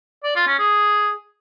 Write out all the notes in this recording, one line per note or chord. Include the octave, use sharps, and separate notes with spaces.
D5
F4
C#4
G#4